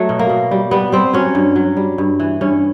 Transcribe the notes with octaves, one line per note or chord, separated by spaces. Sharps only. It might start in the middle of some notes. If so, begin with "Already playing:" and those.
Already playing: F#3 A3
B2
A#3
B2
G3
G3 B3
G3 C4
F#3 C#4
G2
F#3
G3
G2
E3
G2 C#4